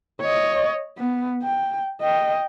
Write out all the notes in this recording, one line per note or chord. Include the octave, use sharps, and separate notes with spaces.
C#5 D#5
B3
G5
D#5 G5